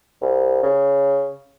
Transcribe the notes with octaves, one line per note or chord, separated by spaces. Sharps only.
C2
C#3